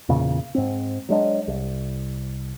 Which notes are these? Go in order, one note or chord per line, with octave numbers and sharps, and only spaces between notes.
E2 A#2 C#3
G#2 C4
F#3 G#3 D4
C2